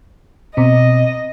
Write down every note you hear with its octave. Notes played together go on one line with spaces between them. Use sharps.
B2 C4 D#5